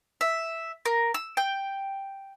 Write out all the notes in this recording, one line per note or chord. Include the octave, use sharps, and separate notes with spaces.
E5
A#4
E6
G5